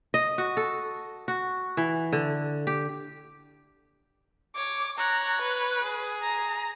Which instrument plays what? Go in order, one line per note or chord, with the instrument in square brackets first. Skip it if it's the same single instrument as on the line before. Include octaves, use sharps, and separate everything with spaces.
[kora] D#5
F#4
A4
F#4
E3
D3
G4
[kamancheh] C#5 [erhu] D6
[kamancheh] C#5 F#6 [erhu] A#5
[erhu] B4
[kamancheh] G#4
[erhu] A#5